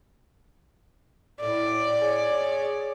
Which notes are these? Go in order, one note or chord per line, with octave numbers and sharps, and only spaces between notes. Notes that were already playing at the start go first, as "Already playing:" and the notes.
A2 D5
G#4 C#5